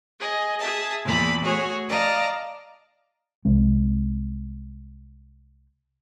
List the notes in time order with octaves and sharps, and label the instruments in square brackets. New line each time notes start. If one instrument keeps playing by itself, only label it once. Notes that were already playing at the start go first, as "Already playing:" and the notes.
[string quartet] G#4 D#5
G#4 E5 A5
E2 A#2 A5 B5
A3 F#4 G#4 C#5
D5 D#5 F5 A5 A#5
[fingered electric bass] C2 G#3 C4